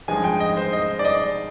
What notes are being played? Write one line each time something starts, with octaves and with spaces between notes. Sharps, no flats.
G2 F3 G#3 G#5
G5
D#5
C5
D#5
D5
D#5